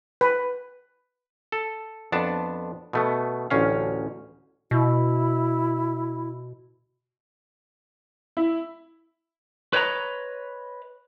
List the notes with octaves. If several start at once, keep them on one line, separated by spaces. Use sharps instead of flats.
B4
A4
F2 B3 D4 A5
B2 A3 B3
A1 D2 C#4 F5
B2 E4
E4
B4 C#5 D#5 G5 A#5